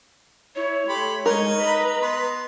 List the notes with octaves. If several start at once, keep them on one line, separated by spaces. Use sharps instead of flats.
E4 C#5
A3 G4 B5 C6
G#3 D#4 A#4 C#5
B4 D#5 A#5 B5
B3 C6